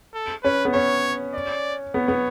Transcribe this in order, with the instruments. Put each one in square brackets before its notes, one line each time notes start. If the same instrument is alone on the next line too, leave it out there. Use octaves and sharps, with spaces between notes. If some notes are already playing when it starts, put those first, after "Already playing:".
[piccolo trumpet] A4
[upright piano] C#4 [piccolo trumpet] B4
[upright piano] B3
[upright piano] C#4 [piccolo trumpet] C#5
[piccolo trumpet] D5
[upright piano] B3 [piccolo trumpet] C#5
[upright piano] B3